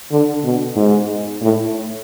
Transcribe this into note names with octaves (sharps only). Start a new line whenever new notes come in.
D3
B2
G#2
A2